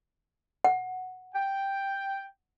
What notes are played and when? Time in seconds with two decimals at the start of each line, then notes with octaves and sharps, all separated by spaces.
0.64 F#5
1.35 G5